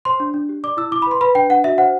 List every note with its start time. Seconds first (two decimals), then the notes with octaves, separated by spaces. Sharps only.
0.05 C5 C6
0.20 D4
0.34 D4
0.49 G4
0.63 D5 D6
0.77 E4 E6
0.91 E4 D6
1.02 B5
1.07 B4 C6
1.21 B4 B5
1.35 D4 G5
1.50 D4 F#5
1.64 F#4 E5
1.78 C5 F#5